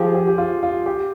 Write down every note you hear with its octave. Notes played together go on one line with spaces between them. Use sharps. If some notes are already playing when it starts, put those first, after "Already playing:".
Already playing: F3 G4 G#4
G4
G4
F4
F4
G4